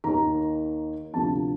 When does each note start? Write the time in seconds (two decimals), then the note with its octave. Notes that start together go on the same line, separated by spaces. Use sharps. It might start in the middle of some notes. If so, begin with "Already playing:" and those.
0.04 D#2 D#3 A#5
1.13 D2 C3 F3 A5